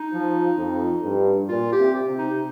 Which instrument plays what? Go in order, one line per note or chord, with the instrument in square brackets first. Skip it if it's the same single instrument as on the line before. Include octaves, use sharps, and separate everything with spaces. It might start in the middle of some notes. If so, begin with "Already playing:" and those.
Already playing: [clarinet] D#4
[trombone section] F3
F2
G2
[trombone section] A#2 [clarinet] F4
[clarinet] G4
[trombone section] C3
C3
[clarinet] D#4